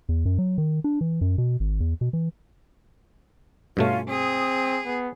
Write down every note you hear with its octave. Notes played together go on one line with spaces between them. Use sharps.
E2
F#2
F#3
D#3
D4
E3
F#2
B2
G#1
E2
B2
E3
G2 B2 A3 C#4 F4 F5
C4 G#4 D#6
B3